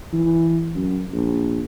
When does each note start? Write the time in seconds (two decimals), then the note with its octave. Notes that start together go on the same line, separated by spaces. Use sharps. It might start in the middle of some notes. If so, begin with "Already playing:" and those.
0.13 E3
0.75 F#2
1.13 A#1